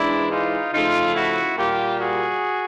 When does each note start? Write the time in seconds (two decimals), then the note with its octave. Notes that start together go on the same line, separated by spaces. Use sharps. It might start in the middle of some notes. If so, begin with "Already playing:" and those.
Already playing: G#2 E3 G#3 D4 E4
0.30 D#4 F4
0.73 C#3 F3 A3 D#4 F4
1.15 E4 F#4
1.57 A#2 G3 A#3 F4 G4
2.00 F#4 G#4